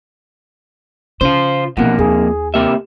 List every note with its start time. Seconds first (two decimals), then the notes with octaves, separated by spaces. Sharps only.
1.21 C#3 F4 C5
1.77 B1 F2 A#2 A#3 B3 F#5
1.99 D#2 G#4
2.54 C3 A#3 G4 E5